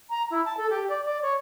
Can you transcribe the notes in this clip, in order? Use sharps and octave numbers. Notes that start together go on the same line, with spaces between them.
A#5
E4
A5
A4
G4
D5
D5
C#5